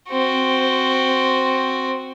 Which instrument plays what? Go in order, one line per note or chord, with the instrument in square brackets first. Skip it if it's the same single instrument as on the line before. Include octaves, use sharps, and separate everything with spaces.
[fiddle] C4 F#4